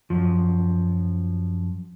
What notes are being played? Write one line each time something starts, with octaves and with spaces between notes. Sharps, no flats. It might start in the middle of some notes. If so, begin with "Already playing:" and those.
F#2 F3